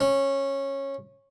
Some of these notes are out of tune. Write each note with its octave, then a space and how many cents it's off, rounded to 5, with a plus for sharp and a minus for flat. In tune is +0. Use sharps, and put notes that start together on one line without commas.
C#4 -15